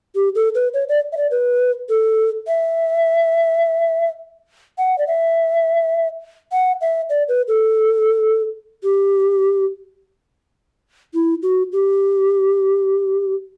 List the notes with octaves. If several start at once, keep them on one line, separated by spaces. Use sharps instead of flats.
G4
A4
B4
C#5
D5
E5
D5
B4
A4
E5
F#5
D5
E5
F#5
E5
D5
B4
A4
G4
E4
F#4
G4